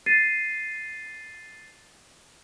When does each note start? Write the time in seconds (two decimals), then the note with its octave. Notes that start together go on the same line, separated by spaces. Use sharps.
0.06 A6 C7 D#7